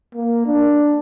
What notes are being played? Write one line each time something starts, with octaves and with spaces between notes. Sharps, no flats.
A#3
D4